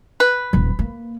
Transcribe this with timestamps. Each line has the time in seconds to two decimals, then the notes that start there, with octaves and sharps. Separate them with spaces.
0.20 B4
0.53 D#1 F3
0.79 A#3